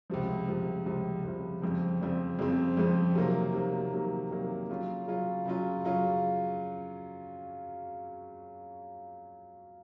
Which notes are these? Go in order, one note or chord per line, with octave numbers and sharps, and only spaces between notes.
C#2 C3 F3
C#2 C3 F3
C#2 C3 F3
C#2 C3 F3
F2 C#3 F3 C4
F2 C#3 F3 C4
F2 C#3 F3 C4
F2 C#3 F3 C4
C3 D#3 F#3 A#3
C3 D#3 F#3 A#3
C3 D#3 F#3 A#3
C3 D#3 F#3 A#3
C#3 F#3 C#4 F4
C#3 F#3 C#4 F4
C#3 F#3 C#4 F4
C#3 F#3 C#4 F4